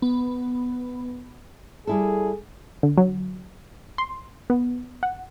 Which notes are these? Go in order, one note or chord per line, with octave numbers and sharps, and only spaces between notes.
B3
G3 E4 G#4 A4
D3
F#3
C6
B3
F#5